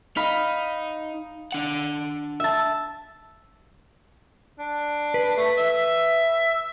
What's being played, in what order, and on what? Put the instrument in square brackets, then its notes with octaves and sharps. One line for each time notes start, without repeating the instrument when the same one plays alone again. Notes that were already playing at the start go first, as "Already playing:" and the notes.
[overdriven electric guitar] D#4 [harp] F5 B5
[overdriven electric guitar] D4 F#5
[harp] E5 A5
[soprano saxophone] D4
[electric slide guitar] B4
[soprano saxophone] A3
E5